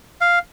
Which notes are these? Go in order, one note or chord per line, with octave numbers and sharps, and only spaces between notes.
F5